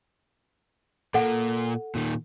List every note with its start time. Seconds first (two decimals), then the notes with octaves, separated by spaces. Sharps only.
1.14 A#2 A#3 A4 F#5
1.95 A#2 D#3